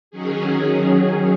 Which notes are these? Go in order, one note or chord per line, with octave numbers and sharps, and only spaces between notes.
D#3 F#3 C#4 G#4